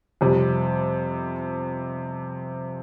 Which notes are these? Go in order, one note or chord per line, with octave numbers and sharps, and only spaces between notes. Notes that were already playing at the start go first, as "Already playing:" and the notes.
F2 C3 G3